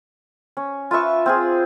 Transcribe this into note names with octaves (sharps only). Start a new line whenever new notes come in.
C#4
F4 B4 E5 C#6
C4 F4 G#4